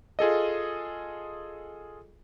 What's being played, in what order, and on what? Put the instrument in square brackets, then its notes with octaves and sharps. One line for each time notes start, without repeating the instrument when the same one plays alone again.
[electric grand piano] F4 G#4 A4 D#5